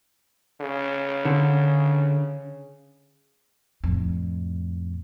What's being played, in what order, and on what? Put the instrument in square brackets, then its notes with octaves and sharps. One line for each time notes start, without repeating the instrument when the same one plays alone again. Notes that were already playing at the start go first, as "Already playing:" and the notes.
[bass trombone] C#3
[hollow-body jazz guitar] D3
[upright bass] F2 A2